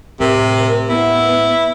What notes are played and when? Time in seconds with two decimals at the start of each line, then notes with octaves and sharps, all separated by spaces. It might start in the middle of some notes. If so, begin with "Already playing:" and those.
0.20 A2 C3 A#4
0.89 B3 E4